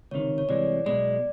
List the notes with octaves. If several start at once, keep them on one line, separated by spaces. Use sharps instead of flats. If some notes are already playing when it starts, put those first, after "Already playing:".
C#2 C3 D#3 C#5
C#5
C2 C3 E3 G#3 D5
B1 B2 G#3 D5